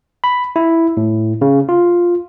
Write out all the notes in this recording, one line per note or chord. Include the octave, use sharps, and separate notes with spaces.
B5
E4
A2
C#3
F4